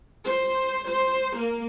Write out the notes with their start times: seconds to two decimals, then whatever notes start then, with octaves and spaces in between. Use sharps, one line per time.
0.25 C5
0.89 C5
1.36 A#3